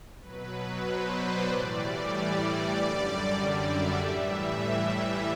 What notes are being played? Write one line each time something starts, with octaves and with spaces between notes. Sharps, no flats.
B2 F#3 B4
B4
C5
D5
A2 E3 G3 D5
D5
F#2 D3 G3 D5
D5
E5
A2 E3 G3 E5